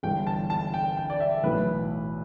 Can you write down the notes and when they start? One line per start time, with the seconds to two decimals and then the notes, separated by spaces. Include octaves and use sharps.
0.03 G1 G2 E3 G5
0.27 A5
0.50 A5
0.74 G5
0.97 G5
1.10 D5
1.20 E5
1.43 B1 A2 E3 B4